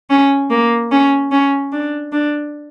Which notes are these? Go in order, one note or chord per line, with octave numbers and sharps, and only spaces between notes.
C#4
A#3
C#4
C#4
D4
D4